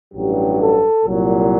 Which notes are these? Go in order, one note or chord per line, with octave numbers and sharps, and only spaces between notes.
A1 G2 F#3 G4
A4
C2 A#2 F#3